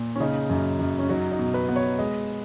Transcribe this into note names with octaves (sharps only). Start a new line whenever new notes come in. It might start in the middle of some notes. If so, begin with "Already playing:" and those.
Already playing: A#2
C#4
C#3 D#4
F#2
F#2
C#4
F#3 D#4
D#4
B2
B4
B3
C#5
G#3 D#5